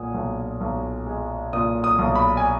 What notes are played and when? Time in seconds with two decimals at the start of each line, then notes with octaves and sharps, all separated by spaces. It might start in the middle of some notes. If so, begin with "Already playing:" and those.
Already playing: B1 A#2 F#5 G#5 D#6
0.14 B1
0.61 B1
1.06 G#3
1.53 A#2 D#6
1.84 D#6
1.99 B1
2.15 B5
2.37 G#5